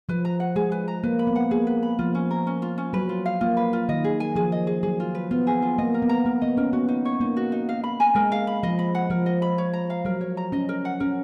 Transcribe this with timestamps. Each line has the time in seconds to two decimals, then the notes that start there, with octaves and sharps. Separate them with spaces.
0.09 F3 B4
0.25 A#5
0.40 F#5
0.56 G#3 G#4
0.72 B4
0.88 A#5
1.03 A#3 B4
1.19 B5
1.27 B3
1.36 F#5
1.51 A#3 G#4
1.67 B4
1.83 B5
1.99 F3 F4
2.15 C#4
2.31 A#4
2.47 C#4
2.62 F4
2.78 C#4
2.93 F#3 B4
3.09 F4
3.26 F5
3.41 A#3 F4
3.57 B4
3.73 F4
3.89 D#3 D#5
4.04 G#4
4.20 G#5
4.36 F3 G#4
4.52 D#5
4.67 G#4
4.83 F#3 G#4
5.00 F4
5.15 B4
5.31 B3 F4
5.47 G#4
5.62 F4
5.78 A#3 D#5
5.94 A#4
6.02 B3
6.09 A#5
6.25 A#3 A#4
6.41 B3 D#5
6.57 C#4 A#4
6.73 B3 F#4
6.88 D#4
7.05 C#5
7.20 A#3 D#4
7.37 F#4
7.52 D#4
7.69 F5
7.84 B5
8.00 G#5
8.15 G#3 A#4
8.32 F5
8.47 B5
8.63 F3 D#5
8.79 B5
8.95 F#5
9.10 F3 A#4
9.26 D#5
9.42 B5
9.58 C#5
9.73 A#5
9.90 F5
10.05 F#3 A#4
10.21 C#5
10.37 A#5
10.52 C#4 D#5
10.69 A#4
10.85 F#5
11.00 C#4 A#4